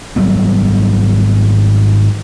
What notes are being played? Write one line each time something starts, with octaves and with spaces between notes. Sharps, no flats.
G#1 F#3 G3 B3